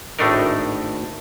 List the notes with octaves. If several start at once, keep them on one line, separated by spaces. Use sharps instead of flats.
G#1 A2 A3 D4 D#4 A#4